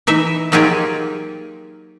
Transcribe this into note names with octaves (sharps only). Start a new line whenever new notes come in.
E3 D#4 E5
F#3 A#3 D#4 F4 G4 G#4